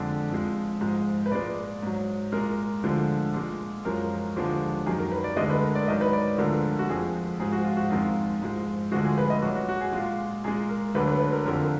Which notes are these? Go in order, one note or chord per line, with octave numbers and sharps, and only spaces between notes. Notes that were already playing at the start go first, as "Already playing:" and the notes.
Already playing: F2 D3 G#3 D5
F2 F3 G#3
G#2 F3 G#3
B4
A#2 G#3 D5
G#2 F#3
A#2 G#3 A#4
D2 D3 F3 G#3
A#2 G#3
F#2 F3 G#3 A#4
D#2 D3 F3 G#3
F#2 D#3 F#3 G#4
A#4
B4
D5
D2 D3 G#3 D#5
B4
A#4
D5
G#2 D#3 F#3 D#5
B4
D5
D2 D3 F3 G#3 A#4
F#4
F2 F3 G#3 G#4
G#2 F3 G#3 G#4
F#4
F4
F#4
F2 D#3 G#3 F4
G#2 F3 G#3
D2 D3 F3 G#3 F#4
G#4
B4
D#5
A#2 F#3 F#4
F#4
F#4
G#4
A#2 G#3 F4
A#2 G#3 G#4
A#4
D2 D3 F#3 B4
B4
B4
A#4
F2 D3 F3 A#4